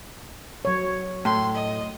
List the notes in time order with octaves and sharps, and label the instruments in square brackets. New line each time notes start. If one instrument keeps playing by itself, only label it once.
[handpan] F#3 C#5
[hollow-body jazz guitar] A2 [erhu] C6
[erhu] D#5